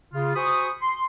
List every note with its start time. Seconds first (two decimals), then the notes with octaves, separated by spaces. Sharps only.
0.14 C#3 F4
0.35 F#4 C5 G#5 B5 C#6 D#6
0.81 C6